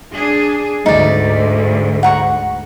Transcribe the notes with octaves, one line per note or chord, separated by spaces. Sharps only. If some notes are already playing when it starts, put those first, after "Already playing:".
D4 G#4
D2 G#2 D#4 D5
F#5 A#5 C#6